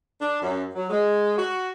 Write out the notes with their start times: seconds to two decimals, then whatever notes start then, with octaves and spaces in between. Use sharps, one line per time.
0.21 D4
0.41 F#2
0.75 F#3
0.90 G#3
1.38 F#4